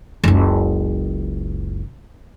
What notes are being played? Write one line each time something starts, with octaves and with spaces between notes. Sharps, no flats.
F#1 C#2